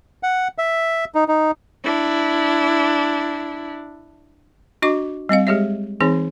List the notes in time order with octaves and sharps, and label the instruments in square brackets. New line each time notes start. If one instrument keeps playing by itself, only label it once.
[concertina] F#5
E5
D#4
D#4
[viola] D4 E4
[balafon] D4 F#4 D#5 C#6 D6
G3 C4 D#5 F5
G#3 G4 G#4 C#5 E5
E3 C4 D#4 G#4 C#5